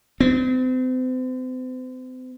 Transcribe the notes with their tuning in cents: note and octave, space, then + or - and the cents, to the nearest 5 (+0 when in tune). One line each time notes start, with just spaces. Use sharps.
C4 -40